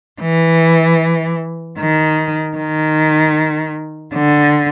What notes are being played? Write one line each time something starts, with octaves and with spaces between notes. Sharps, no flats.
E3
D#3
D#3
D3